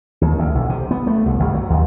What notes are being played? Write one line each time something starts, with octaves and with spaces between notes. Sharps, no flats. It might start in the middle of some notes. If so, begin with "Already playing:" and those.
D#2
D2
B1
C3
B3
A3
C2
G1
F#3
D#2